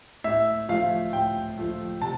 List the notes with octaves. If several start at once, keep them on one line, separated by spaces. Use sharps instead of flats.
A2 E5
F3 A3 F5
A2 G5
F3 A3
C3 A5